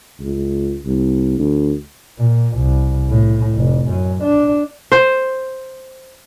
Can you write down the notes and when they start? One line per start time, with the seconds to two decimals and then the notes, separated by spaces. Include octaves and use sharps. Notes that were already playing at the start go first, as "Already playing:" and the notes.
0.20 C#2
0.85 C2
1.38 D2
2.19 A#2
2.56 C2
3.09 A2
3.56 F1
3.89 F#2
4.24 D4
4.92 C5